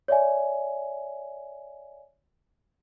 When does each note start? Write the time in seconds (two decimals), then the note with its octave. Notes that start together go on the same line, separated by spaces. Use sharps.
0.08 C#5 D5 E5 G#5